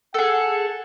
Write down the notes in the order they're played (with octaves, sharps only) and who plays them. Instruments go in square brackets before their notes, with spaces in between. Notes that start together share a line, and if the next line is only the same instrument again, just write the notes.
[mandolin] G#4 A4 [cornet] F#5